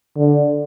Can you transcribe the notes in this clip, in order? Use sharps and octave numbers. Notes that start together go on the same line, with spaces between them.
D3